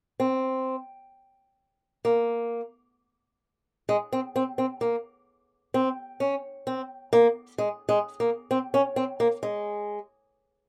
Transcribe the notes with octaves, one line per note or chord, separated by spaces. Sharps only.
C4
A#3
G#3
C4
C4
C4
A#3
C4
C#4
C4
A#3
G#3
G#3
A#3
C4
C#4
C4
A#3
G#3